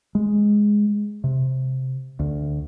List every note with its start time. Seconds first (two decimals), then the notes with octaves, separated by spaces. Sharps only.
0.15 G#3
1.24 C3
2.19 D2